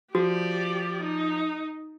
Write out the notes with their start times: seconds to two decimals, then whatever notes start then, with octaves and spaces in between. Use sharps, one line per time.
0.15 F3 F#4 G4 D5
1.03 D#4